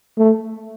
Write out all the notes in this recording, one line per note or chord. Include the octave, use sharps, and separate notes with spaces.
A3